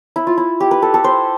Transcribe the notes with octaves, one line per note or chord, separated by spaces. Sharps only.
E4
F4
E4
G4
B4
A4
A4
C5